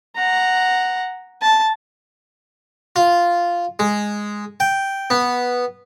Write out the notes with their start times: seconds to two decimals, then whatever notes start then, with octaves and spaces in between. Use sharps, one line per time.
0.16 F#5 A#5
1.42 A5
2.96 F4
3.79 G#3
4.60 G5
5.10 B3